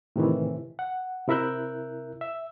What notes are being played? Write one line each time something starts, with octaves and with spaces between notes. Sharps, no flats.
A2 C3 D#3 E3
F#5
C3 E4 A#4 E5 F#6 G6
E5